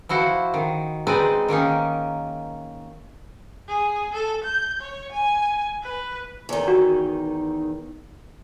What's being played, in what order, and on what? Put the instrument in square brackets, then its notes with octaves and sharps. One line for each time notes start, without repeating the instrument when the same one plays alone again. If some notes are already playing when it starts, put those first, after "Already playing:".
[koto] F3 E4 F#4 C5
D#3
G#3 C4 D#4 B4 D5 D#5
D#3 A#3 C#4 D#4
[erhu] G#4
A4
G6
C#5
G#5
B4
[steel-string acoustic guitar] E2 D#3
[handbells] F#4